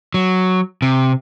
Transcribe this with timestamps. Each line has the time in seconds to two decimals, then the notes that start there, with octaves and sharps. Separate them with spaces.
0.14 F#3
0.82 C3